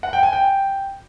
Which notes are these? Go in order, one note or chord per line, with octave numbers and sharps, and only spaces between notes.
F#5
G5
G#5
G5